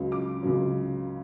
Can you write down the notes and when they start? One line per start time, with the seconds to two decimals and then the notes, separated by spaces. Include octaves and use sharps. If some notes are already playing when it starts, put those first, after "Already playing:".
Already playing: C#2 C#3 F#3
0.12 D6
0.43 C#2 C#3 F#3